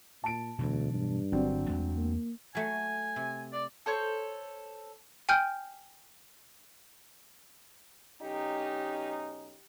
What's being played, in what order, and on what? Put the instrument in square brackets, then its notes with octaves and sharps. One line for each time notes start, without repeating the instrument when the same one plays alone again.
[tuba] A#2 [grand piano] A5 D7
[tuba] D2 [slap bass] B2 E3 F#3
[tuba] G2
[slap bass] G1 [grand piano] F#3 C4 D4
[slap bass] E2 G#3 A3
[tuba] A#3
[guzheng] F#3 A3 [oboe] G#5
[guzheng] C3
[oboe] D5
[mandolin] A4 C5 C#5
[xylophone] G5 G#5 F6 G6 D7
[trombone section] B1 C#4 D#4 [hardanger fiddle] G4